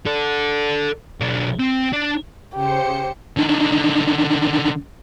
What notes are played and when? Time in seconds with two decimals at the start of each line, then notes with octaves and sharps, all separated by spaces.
0.06 A4 D5
1.21 B1 D4
1.59 C4
1.92 D4
2.54 C#3 G4 C5 C#7
3.37 D3 D#3